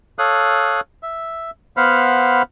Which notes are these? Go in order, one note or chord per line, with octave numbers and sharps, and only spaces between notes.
A4 C#5 F5 D#6 F#6
E5
B3 C5 F5 F#5 B5 F6